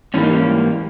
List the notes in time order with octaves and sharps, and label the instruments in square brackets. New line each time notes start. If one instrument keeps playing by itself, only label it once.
[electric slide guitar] G#2 E3 G3 A#3 C#4
D#4
C#4